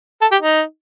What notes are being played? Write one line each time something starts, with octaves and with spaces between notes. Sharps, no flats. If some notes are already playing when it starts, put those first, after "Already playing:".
A4
G4
D#4